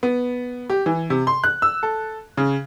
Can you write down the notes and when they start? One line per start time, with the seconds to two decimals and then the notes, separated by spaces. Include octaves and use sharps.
0.03 B3
0.70 G4
0.86 E3
1.10 C3
1.27 C6
1.44 F#6
1.62 E6
1.83 A4
2.37 C#3